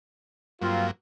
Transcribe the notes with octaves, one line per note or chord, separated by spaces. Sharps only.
G2 F#3 A#3 C4 F4